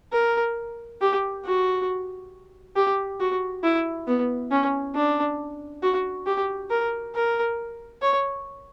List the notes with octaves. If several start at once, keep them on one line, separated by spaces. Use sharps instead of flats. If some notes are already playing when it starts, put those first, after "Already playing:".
A#4
G4
F#4
G4
F#4
E4
B3
C#4
D4
F#4
G4
A#4
A#4
C#5